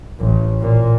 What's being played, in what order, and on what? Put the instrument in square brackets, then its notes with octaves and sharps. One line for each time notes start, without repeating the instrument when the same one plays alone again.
[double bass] A1
A#2